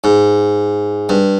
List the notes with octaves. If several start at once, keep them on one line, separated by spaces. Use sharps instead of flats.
G#2
G2